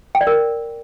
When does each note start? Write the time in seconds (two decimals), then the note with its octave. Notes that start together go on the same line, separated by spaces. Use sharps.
0.15 G5
0.21 D5
0.27 A#4